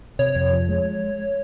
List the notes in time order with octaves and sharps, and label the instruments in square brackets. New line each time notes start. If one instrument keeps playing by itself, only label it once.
[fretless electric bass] C3 [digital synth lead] C#5
[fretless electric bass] F2
F3
G#3